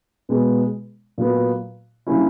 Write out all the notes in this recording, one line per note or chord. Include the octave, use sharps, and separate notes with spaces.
B2 G#3 B3
A#2 F#3 B3
D3 G3 A#3 C#4 E4